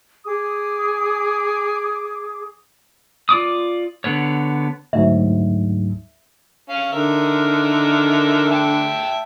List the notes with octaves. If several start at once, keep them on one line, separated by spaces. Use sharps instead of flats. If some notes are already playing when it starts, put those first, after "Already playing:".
G#4 D6 D#6
F4 D5 D6 D#6
D3 B3 C#5
D2 G#2 F#3 E5
C#4 F5
D3 D#3 A#4 E5
E5 G5 A5